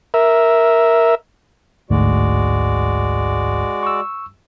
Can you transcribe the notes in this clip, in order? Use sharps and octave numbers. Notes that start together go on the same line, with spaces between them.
A#4 E5
A1 D2 G#2 G#3 F#4 D5
C#6 E6